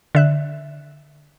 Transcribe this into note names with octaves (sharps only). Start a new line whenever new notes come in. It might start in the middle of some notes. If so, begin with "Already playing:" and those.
D3 E5 F#6